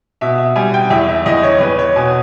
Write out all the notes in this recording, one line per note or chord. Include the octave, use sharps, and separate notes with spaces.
B2 E5
E5
G3 G#5
G5
E2 E5
E5
E2 D#5
C#5
E2 B4
C#5
B2 G#5